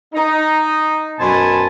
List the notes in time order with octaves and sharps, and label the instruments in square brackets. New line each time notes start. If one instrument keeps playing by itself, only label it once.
[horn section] D#4
F#2 B2 C5 G#5 A5 B5